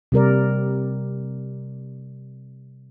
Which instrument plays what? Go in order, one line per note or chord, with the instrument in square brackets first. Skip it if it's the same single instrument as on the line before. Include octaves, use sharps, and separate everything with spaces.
[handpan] C3 G3 A#4 D5